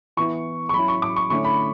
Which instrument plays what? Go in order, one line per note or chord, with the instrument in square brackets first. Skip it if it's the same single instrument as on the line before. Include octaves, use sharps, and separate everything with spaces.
[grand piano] E3 B3 E4 C#6
C#6
F#3 C#4 E4 B5
C#6
D6
C#6
D3 A3 C#4 E4 C#6
B5